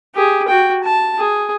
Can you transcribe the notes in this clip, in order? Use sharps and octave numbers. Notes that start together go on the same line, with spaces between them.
G4 G#4
F#4 G5
A5
G#4